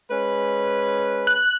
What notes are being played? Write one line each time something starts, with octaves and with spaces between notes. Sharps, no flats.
G#3 C#4 B4
F#6